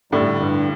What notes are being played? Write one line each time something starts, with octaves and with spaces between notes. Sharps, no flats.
A2 D3 G3
G2